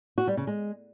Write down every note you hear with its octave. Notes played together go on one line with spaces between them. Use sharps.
F#4
G3
C#3
G#3